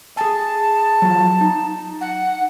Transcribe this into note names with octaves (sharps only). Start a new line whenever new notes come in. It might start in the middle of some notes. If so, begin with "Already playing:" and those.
G#4 G#5 A5
F#3 F4
D#4
F#5